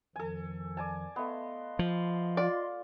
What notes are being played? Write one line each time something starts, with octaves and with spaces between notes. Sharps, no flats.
F2 D#3 F3 A4 G#5
D5 G#5 A5
A3 B3 D#5 F5 C6
F3
F4 D5